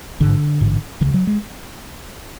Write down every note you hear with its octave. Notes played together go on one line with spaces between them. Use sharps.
A1 G#2 D3
A1 G#2
D2 C#3 E3
F#3
G#3